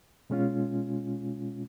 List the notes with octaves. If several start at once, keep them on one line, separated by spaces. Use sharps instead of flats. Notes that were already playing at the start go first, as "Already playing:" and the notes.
B2 G#3 C#4 F4